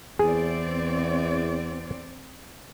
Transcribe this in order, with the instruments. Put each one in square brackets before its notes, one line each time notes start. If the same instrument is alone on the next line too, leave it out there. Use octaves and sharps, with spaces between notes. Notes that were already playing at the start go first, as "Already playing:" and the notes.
[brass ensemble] E2 [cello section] C4 D5 [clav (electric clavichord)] G#4